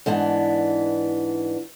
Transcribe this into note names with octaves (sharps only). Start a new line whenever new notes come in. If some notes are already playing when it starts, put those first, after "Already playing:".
G#2 E3 B3 D4